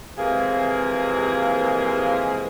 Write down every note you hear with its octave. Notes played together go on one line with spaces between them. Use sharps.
C3 E3 F3 G#3 A#3 G#4